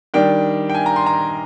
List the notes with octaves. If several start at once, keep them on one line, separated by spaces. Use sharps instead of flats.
D#3 G3 D4 G5
G5
G#5
A#5
C6
A#5